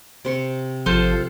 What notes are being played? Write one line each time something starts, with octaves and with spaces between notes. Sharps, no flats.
C3 C6 C#6
G#1 F3 F4 A4 C5